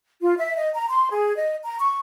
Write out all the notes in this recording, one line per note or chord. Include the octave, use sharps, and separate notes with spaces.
F4
E5
D#5
A#5
C6
G#4
D#5
A#5
C#6